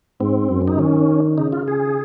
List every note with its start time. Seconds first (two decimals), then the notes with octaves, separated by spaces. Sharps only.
0.20 G#2 C4
0.49 F#2
0.68 D#4
0.79 D#3 C#4
1.38 C#3 D#4
1.52 F4
1.68 G#4